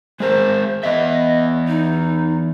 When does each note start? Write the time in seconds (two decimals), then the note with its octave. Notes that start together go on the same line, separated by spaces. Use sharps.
0.20 G#3 G#4 A#4 C5
0.83 E3 B3 D#5 E5
1.68 D#4